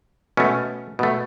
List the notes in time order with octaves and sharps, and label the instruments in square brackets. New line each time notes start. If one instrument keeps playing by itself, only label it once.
[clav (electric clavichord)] B2 A3 C#4
B2 A3